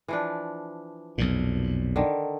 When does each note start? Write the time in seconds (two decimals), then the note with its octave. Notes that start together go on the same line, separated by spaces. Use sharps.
0.08 E3 F3 D4
1.18 B1 F2 A#2
1.96 D3 D#3